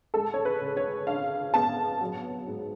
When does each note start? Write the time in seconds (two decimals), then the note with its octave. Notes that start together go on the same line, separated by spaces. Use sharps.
0.14 G#3 A4
0.34 C#5
0.45 B4
0.61 C#3
0.77 C#5
1.07 D4 F5
1.54 B3 A5
2.01 F#3
2.47 G#2